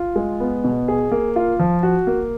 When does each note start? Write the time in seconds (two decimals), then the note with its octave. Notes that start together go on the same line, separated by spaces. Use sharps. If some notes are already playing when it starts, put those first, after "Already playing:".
Already playing: F4
0.16 G#3
0.40 B3
0.64 B2
0.88 G#4
1.11 A#3
1.36 F4
1.59 F3
1.83 F#4
2.07 A#3